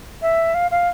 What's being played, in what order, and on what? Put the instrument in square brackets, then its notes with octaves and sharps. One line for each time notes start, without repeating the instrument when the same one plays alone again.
[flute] E5
F5
F5